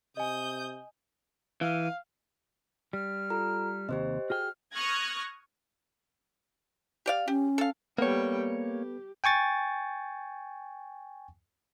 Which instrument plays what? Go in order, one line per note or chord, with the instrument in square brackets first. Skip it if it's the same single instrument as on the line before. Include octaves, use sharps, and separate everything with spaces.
[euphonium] C3 [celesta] D#5 G#5 [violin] D#6 G6
[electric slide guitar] E3 [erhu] F5
[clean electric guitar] G3 [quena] F6
[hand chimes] F4 A4 A#5
[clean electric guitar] D#2 C3 [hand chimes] G4 C5 D#5
[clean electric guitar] F#4 G#4 G5 [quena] F6
[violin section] C#6 D#6 F6 F#6 G#6 A#6
[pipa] G4 D5 F5
[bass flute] C#4 [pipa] G4
[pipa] A4 F5
[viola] G3 G5 [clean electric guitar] A#3 C#5 [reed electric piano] B3 A4 B4
[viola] G4
[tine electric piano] G5 G#5 C#6 A6